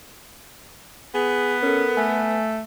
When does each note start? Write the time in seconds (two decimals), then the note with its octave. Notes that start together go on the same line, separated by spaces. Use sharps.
1.14 B3 G#4
1.63 C#4 A4 A#4
1.97 A3 G#5